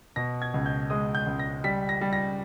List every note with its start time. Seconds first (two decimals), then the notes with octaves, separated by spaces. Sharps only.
0.16 B2 A#6
0.42 G#6
0.54 C#2
0.66 G6
0.90 G#3 D#6
1.15 G6
1.26 C#2
1.39 A#6
1.64 G3 B6
1.89 A#6
2.01 G3
2.13 A#6